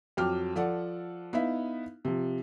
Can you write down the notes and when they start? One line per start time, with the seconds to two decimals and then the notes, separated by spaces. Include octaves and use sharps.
0.17 F2 F#3 G5 D6 F6
0.56 F3 A4 D5 F#5
1.33 B3 D#4 E4 E5 F5
2.05 C3 F3